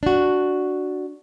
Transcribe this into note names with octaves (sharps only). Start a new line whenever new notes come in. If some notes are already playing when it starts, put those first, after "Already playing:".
D4 F#4